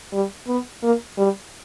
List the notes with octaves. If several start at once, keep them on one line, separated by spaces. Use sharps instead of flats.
G3
B3
A#3
G3